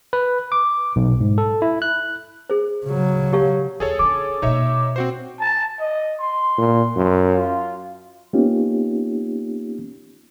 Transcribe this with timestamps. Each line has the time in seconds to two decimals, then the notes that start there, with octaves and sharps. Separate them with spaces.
0.13 B4
0.52 D6
0.96 B1
1.21 G#2
1.38 A4
1.62 E4
1.82 F#6
2.50 G#4 C5
2.86 C#3 F#3
3.33 G4 C#5 F5
3.80 D#2 G#4 A4 C#5
3.99 D3 C#4 D6
4.42 B2 A#3 D#4 C#5 E5
4.96 C4 F#4 C5
5.40 A5
5.80 D#5
6.20 C6
6.58 A#2
6.97 F#2
7.34 F4
8.33 A#3 B3 C#4 D#4 F4 G4